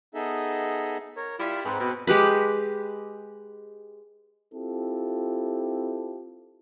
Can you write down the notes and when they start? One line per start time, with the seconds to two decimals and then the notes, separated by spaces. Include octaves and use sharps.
0.14 B3 D#4 G#4 A4 D#5 E5
1.16 A#4 C#5
1.39 G3 E4 F4
1.65 G#2 C4 B4
1.80 B2
2.07 G#3 G4 B4 B5
4.53 C4 E4 F4 G4 A4